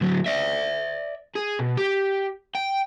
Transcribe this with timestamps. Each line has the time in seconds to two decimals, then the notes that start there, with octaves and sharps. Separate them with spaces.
0.01 D2 F#3
0.26 D5 E5
1.35 G#4
1.59 B2
1.77 G4
2.55 G5